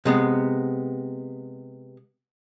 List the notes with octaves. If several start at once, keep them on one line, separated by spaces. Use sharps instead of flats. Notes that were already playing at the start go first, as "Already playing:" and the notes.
C3 G#3 B3